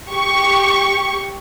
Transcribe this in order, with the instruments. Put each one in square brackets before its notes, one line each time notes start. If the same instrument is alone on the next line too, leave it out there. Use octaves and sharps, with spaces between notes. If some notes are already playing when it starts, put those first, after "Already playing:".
[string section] G4 C#6